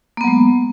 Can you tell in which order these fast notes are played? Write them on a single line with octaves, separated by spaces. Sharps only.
A#3 B3 F#3 G#3